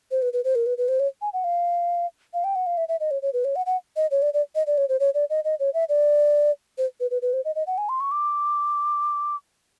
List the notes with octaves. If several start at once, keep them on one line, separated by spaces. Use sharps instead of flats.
C5
B4
B4
C5
A#4
B4
B4
C5
C#5
G#5
F#5
F5
F5
G5
F#5
F5
E5
E5
D#5
C#5
C#5
B4
C#5
F#5
F#5
D#5
C#5
D5
D5
D#5
D5
C#5
C5
C#5
D5
D#5
D#5
C#5
E5
D5
C5
B4
B4
B4
C5
D#5
D#5
F#5
G#5
C6
C#6
D6